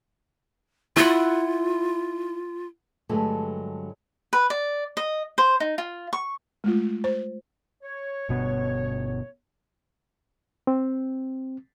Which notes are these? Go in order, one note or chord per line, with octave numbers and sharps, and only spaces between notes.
E4 F4 F#5
G2 D3 F#3 G#3 A3
B4
D5
D#5
C5
D#4
F4
C#6
G#3 A3 F4
C5
C#5
G1 B2 B3
C4